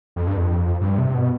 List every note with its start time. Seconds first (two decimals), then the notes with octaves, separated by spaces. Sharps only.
0.16 F2
0.27 G2
0.37 F2
0.81 G2
0.98 C3
1.14 B2